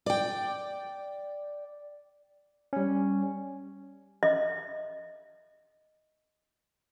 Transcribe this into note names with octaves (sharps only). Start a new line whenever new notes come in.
D5 G5
G3 C#4
D#5 E5